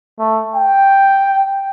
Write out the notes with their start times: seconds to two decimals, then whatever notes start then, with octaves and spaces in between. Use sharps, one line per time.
0.19 A3
0.55 G5